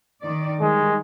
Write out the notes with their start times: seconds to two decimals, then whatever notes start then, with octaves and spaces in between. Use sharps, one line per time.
0.22 D#3 D5
0.61 D#3 G3 G#3